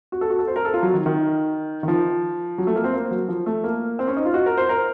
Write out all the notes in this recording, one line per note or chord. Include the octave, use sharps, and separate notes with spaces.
F#4
A4
F#4
A4
C5
A#4
A4
F4
F#3
D#3
D#3
D#3
F3
F#3
A3
A#3
C4
A#3
F#3
F3
A3
A#3
C4
C#4
D#4
F4
F#4
A#4
C5
A#4